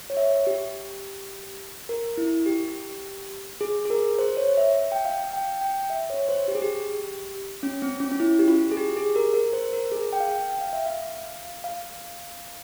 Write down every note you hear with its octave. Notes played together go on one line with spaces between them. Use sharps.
C#5
E5
G4
A#4
E4
G4
G#4
G#4
A#4
C5
C#5
E5
G5
F5
G5
G5
E5
C#5
C5
G4
G#4
G4
C#4
C4
C#4
C#4
E4
G4
F4
G#4
G4
G#4
A#4
A#4
C5
A#4
G#4
G5
F5
G5
F5
E5
F5
F5